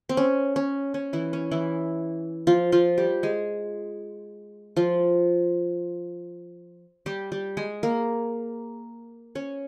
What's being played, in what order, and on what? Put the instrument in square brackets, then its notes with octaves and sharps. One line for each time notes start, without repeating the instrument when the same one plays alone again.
[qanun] C4
C#4
C#4
C#4
E3 E4
C#4
E3 E4
F3 F4
F3 F4
G3 G4
G#3 G#4
F3 F4
G3 G4
G3 G4
G#3 G#4
A#3 A#4
C#4 C#5